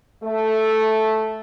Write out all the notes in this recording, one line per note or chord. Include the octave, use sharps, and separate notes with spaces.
A3